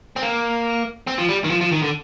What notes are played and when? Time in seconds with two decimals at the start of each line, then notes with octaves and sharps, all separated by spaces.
0.16 C4
0.22 A#3
1.07 C4
1.18 F3
1.29 G3
1.44 D#3
1.50 F3
1.61 F3
1.72 D#3
1.82 D3